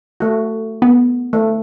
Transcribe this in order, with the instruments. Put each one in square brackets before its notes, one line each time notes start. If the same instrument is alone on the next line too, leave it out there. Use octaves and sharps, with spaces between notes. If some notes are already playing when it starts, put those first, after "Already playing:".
[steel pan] A3 F#4
[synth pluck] B3
[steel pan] A3